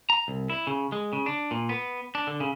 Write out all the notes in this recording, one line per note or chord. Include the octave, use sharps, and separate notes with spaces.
A#5
C2
E4
C#3
G#3
C#3
D4
A#2
B3
D4
D3
C#3